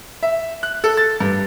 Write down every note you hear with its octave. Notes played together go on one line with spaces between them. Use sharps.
E5
F#6
A4
A6
G2